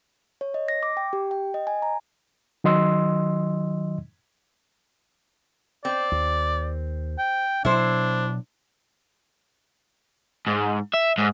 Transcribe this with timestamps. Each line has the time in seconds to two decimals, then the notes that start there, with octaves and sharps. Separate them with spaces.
0.41 C#5
0.54 D#5
0.68 A#6
0.83 D6
0.97 G5
1.13 G4
1.31 G5
1.54 D#5
1.67 G#5
1.82 A#5
2.64 D#3 F#3 D#5 C6 E6
5.85 C4 D5
6.12 D#2
7.18 G5
7.65 B2 F#3 D4 E4 C5
10.47 G#2
10.94 E5
11.18 G#2